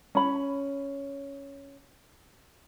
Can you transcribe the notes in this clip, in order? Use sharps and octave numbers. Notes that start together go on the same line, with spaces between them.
C#4 B5